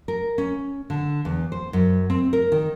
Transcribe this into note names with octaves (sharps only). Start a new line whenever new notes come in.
A#4
C#4
D3
E2
C5
F#2
C4
A#4
D#3